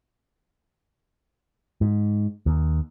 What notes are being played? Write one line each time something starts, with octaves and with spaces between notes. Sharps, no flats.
G#2
D#2